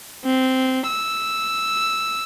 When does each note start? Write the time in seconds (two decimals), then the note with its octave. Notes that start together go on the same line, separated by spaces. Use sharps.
0.25 C4
0.87 E6